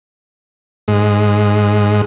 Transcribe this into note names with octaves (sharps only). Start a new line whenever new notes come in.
G#2